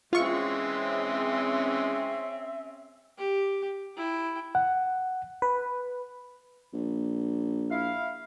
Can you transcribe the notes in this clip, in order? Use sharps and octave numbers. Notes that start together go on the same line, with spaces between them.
E3 G#3 C4 C#4 F4 E5 C#6
G4
E4 G5
F#5
B4
A#1
E4 F5